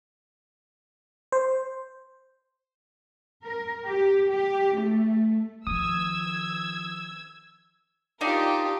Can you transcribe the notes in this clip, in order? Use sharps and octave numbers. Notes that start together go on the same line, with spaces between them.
C5
A#4
G4
G4
A3
D#3 F3 D#6 E6 G#6
D4 D#4 F4 G4 A#4